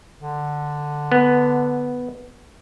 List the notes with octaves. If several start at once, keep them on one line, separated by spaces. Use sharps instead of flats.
D3
B3